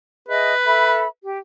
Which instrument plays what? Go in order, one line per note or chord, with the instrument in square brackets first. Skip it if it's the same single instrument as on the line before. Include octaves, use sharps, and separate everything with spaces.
[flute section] G#4 D#5 E5 [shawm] B4
[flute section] A4 E5 B5
G4